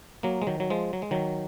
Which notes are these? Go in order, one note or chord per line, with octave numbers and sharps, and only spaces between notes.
F#3 A#3
G#3
D#3 F#3
F#3
F3 G#3
F#3
G#3
D#3 F#3